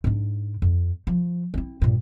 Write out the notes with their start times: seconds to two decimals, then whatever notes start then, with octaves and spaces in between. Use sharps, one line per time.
0.04 G#2 D4
0.62 F2
1.07 F3
1.54 C4 E4
1.82 G2 A#2